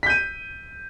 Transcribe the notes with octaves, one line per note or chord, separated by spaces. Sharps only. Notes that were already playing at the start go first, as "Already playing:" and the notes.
G6 B6 D#7